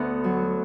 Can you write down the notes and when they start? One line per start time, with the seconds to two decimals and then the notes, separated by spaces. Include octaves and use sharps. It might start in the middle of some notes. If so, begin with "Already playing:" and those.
Already playing: D2 B3
0.24 F#3